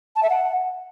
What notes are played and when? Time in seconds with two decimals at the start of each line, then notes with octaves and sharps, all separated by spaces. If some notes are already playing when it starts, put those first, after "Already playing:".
0.16 A5
0.23 E5
0.30 F#5